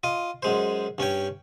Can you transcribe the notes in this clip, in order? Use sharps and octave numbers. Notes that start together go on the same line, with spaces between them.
F4 D#5
F#2 G#3 C5
G2 C#4 C#5 G5